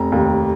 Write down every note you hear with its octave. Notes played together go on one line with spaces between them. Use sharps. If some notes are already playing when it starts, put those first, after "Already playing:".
Already playing: F1 A#5
D#2